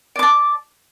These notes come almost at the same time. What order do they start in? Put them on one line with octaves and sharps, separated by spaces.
D5 D6 A5